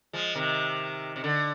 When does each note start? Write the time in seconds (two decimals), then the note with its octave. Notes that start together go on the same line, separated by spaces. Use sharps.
0.13 F3 G#3
0.35 C3 D#3
1.16 C3
1.24 D3